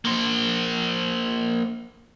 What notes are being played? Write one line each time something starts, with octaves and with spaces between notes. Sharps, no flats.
A#3 C5